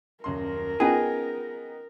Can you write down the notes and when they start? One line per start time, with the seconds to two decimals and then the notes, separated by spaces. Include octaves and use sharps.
0.24 D#1 F#2 A#4 C6
0.80 B3 C#4 D#4 F4 G#4 G5 A5